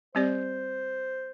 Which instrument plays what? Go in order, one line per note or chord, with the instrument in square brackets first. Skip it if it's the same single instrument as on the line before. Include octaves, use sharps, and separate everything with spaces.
[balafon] G3 C4 G4 D5 [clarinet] C5